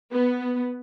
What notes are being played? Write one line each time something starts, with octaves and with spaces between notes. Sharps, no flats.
B3